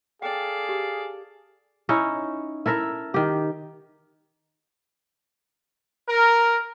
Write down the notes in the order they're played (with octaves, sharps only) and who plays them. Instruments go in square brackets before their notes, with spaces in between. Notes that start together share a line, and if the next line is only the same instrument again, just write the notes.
[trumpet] G#4 [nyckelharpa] A4 D5 [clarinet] F5 [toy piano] G5
[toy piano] G4
[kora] C#4 D#4 E4 C#5
E4 A4 A#4 E5
D#3 G4
[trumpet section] A#4